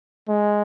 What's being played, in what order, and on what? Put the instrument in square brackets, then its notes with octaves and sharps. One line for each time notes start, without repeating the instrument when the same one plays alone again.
[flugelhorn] G#3